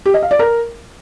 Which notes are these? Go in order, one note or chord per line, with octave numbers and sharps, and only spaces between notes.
G4
D#5
F5
D5
A#4